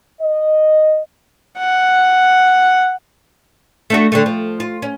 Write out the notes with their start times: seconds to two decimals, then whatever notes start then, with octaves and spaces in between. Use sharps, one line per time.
0.21 D#5
1.59 F#5
3.90 A3 D4 F#4
4.12 D3 G3 A3
4.26 F3
4.60 F4
4.82 C#4